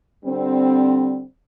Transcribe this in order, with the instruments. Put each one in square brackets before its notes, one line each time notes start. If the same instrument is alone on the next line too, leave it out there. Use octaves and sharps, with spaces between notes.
[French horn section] D3 G3 C4